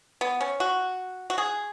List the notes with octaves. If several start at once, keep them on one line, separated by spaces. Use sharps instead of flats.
B3
C#4
F#4
F#4
G#4